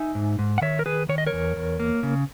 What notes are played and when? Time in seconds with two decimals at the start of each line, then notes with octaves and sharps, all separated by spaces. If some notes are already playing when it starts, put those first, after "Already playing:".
Already playing: D#4 E5 G#5
0.15 G#2
0.39 G#2
0.58 F#5
0.62 D#3 C#5 E5
0.79 A#4
0.86 D#3 G#4 B4
1.09 D#3 C#5
1.18 D#5
1.27 A#4 C#5
1.33 E2
1.56 E2
1.80 A#3
2.03 C#3